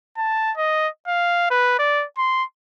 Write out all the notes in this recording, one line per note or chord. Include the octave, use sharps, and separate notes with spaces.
A5
D#5
F5
B4
D5
C6